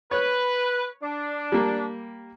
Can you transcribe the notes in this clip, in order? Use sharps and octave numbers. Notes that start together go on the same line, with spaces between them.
B4 C#5
D4
G3 A#3